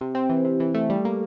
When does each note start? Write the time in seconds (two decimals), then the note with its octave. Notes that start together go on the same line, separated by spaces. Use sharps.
0.01 C3
0.15 C4
0.30 E3
0.44 C3
0.60 E3
0.74 A3
0.90 G3
1.05 A#3